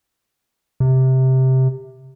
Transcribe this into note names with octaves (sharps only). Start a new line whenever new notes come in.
C3